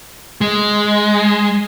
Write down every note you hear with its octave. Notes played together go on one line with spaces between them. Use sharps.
G#3